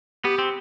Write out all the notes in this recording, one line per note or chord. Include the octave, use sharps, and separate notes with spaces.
B3 G4
C4